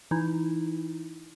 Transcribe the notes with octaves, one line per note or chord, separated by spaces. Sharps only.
E3 D#4 E4